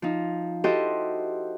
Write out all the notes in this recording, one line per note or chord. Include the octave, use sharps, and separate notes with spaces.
F3 D#4
E4 F#4 G4 A4 C5 D#5